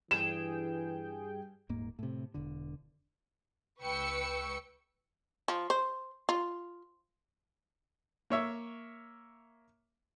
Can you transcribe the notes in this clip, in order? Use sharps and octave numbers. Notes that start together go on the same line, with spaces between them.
G2 E3 G#4 G5 E7
D#1 G#2 A#3
A2 C3
E1 D3
C#2 B4 G5 C#6 E6 C#7
F3
C5
F4
A#3 C#5 E5